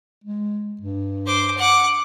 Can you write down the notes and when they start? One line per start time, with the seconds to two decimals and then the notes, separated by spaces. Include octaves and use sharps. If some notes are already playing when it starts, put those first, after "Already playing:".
0.24 G#3
0.81 G2
1.26 C5 D6
1.57 F#5 D6